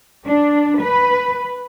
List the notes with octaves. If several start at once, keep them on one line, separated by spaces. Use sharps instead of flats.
D4
B4